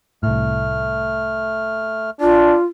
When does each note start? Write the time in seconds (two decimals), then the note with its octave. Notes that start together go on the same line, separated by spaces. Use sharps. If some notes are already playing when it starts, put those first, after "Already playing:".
0.23 C2 A2 A3 F6
2.21 D4 F4